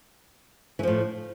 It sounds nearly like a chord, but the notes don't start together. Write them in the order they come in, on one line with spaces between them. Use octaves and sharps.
E3 F3 A2